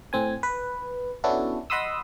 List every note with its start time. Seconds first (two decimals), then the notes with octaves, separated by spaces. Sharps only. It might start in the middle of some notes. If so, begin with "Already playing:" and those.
0.13 A2 C4 G#5
0.43 B4
1.24 B3 C#4 D4 E4 F#4 A4
1.70 D#5 F#5 B5 C6 D#6 E6